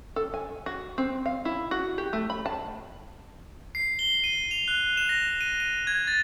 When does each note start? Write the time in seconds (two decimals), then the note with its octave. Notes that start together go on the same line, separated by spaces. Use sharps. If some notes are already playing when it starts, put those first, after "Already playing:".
0.16 A4
0.34 G#5
0.66 F#4
0.98 C4
1.26 F5
1.45 E4
1.71 F#4
1.98 G4
2.13 A3
2.30 B5
2.46 A5
3.75 C7
3.99 G7
4.24 D#7
4.51 F7
4.68 F#6
4.97 E7
5.09 A#6
5.41 D#7
5.60 D#7
5.87 G#6
6.07 A6